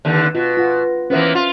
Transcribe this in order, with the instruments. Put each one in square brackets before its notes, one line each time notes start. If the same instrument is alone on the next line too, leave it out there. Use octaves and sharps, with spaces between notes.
[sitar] D#2 D3
[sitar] B2 [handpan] F4
[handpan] F4 F#5
[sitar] E3 A#3 B3 [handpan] C#4 C5 E5
[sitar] F4